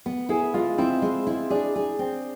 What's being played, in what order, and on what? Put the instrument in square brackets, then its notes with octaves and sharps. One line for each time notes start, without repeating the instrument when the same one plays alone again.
[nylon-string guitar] B3
[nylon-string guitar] E4 [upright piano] G#4
[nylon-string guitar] G#3 [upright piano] F4
[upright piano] C4 [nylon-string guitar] E4
[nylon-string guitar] G#3
E4
[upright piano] D4 [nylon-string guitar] G#4
[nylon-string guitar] G#4
C4